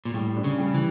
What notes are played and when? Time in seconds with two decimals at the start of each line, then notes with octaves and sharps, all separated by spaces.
0.05 A#2
0.14 A2 G3
0.36 D4
0.44 C#3
0.58 G3
0.74 E3